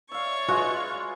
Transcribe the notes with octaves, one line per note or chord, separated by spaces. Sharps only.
C#5 D5 E5 F5 C#6
G#3 F4 F#4 B4